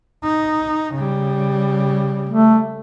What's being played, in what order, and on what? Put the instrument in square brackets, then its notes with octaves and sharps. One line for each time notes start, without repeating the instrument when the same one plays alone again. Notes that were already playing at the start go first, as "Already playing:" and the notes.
[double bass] D#4
C#3 G3
[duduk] A3